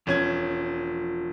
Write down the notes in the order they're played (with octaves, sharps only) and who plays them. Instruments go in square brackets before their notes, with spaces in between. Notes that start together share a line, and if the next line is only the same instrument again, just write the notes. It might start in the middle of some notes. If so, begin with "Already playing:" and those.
[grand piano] E1 C#4 G#6 [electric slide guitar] F3